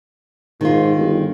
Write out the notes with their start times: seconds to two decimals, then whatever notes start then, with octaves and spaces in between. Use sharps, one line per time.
0.61 G#2 D#3 F4
0.97 G1